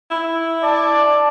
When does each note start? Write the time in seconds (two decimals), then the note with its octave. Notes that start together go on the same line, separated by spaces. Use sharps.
0.11 E4
0.63 D5 A5